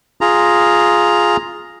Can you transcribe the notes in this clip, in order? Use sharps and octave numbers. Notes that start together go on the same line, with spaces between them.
F4 G#4 A#5